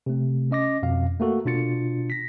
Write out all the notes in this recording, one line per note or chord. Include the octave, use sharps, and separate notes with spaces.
C3 A3
C#4 D#5 D6 A#6
F2 B2 F5
A3 A#3 F#4 A4
B2 D4 F4 A6 C#7
A#6 B6